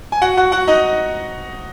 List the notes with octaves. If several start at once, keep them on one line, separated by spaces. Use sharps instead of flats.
G#5
F#4 F#5
F#4 F#5
F#4 F#5
D#4 D#5